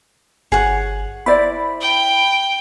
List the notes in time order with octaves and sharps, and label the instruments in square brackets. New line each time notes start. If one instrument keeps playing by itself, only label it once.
[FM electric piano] G1 [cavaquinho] G#4 C#5 F#5
[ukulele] E4 C5 D5 [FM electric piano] B5
[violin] G5